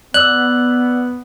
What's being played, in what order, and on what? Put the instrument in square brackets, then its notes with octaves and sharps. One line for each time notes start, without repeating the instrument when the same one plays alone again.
[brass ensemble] B3 [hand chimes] D5 E6 [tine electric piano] F#6